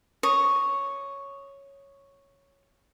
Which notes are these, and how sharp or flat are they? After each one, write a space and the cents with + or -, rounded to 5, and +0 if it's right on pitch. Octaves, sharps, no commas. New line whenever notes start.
C#5 +0 D#6 +0